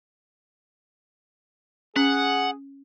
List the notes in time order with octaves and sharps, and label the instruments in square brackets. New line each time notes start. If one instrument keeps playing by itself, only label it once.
[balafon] C#4 [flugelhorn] G#4 [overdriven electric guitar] F#5